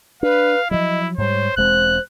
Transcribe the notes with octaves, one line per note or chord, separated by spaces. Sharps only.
D4 B4 F5
F3 F#3 E4 D#5
G#2 G3 C5 C#5
E1 G#3 C4 C5 F#6